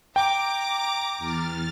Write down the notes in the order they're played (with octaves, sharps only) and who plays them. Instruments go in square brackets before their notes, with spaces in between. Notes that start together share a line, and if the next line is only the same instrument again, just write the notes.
[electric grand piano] G5 [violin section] A#5 D6
[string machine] E2 F6 A6